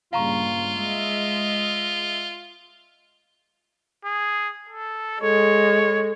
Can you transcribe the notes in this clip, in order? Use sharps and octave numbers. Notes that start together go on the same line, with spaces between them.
G2 A#2 C#3 F4 F5 A#5 C#6
G#3 D#5 E5
G#4
A4
G#3 A4 C#5